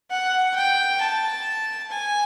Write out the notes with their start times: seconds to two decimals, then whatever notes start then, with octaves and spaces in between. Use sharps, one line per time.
0.11 F#5
0.55 G5
1.01 A5
1.91 G#5